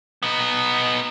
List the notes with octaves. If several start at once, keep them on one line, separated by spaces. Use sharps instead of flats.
B3 D#4